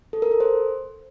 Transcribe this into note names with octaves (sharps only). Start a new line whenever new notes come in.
A4
A#4
A4
C5